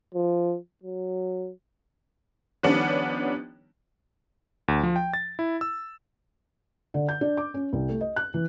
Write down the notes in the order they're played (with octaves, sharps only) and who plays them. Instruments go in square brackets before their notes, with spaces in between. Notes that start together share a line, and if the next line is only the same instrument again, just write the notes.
[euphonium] F3
F#3
[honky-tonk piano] D#3 F3 G3 B3 C#4 D4
[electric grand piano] D2
F3
G5
A6
E4
E6
[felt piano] D3
G6
D4
D6
C#4
C2
A3
D#5
F#6
E3